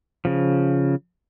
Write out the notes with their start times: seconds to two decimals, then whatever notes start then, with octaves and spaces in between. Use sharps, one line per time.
0.25 C#3 F3